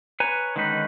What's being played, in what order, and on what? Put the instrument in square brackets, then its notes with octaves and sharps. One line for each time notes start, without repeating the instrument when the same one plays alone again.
[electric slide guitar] B4 C#5 G#5 A#5
D3 D#3 G#3 C#4 D#4 B4